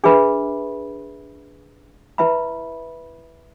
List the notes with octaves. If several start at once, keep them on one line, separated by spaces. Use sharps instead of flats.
D4 G#4 B4 E5 B5
E4 B4 E5 B5